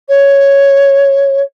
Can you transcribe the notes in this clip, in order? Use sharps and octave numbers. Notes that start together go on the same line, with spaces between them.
C#5